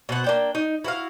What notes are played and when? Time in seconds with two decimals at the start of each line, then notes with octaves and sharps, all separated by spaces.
0.09 B2 C5 F#5
0.24 A#3 D4 G5
0.55 D#4
0.84 E4 F#4 B4 F5